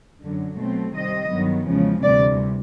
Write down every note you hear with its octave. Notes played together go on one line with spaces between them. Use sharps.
F#2 D3 F#3
B2 F#3 A3 C4
C3 D#3 G3 C4 D#5
G2 D#3 F#3 B3
E2 C#3 F3 G#3
D2 C3 E3 G3 D5